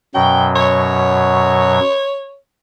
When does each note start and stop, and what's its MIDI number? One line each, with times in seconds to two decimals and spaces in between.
0.14 1.79 42
0.14 1.79 47
0.14 1.79 54
0.14 0.46 79
0.55 2.37 73